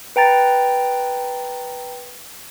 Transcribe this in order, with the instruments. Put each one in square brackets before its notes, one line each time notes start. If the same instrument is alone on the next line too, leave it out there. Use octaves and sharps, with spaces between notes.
[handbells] B4 G5 A#5 A6